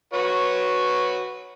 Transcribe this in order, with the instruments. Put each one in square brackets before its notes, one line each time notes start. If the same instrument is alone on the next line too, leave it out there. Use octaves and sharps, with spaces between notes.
[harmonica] F#4 B4 C#5